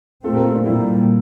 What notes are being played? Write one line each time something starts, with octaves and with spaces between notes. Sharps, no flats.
A#2 A3 C4 F4 A4
G4 A#4
F4 A4
D4 F4
A#2 G3 A#3 C4 E4